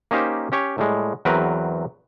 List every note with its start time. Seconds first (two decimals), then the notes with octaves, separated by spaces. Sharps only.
0.11 A#3 C#4 D#4 G4 C5
0.52 C#4 G4 C#5
0.78 A2 G3 G#3
1.25 E2 F#3 C4 A#4 B4